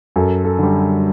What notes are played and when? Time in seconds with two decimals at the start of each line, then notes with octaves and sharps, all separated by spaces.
0.16 F#2 A4
0.45 A4
0.59 D3 G3